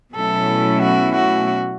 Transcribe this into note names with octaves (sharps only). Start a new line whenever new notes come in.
B2 F#3 A3 C#4 E4 A4
F#4
F#4